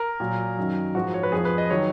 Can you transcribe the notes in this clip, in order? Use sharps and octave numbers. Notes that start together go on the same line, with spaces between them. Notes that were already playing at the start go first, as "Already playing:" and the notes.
Already playing: A#4
A#2 F#3
F#2 D#3 F#3
G#2 F3 F#4
C#5
B4
F2 F3 G#4
B4
D#5
D#3 F#3 C#5